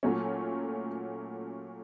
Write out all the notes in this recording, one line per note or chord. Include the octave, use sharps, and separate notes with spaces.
A#2 F#3 A3 C#4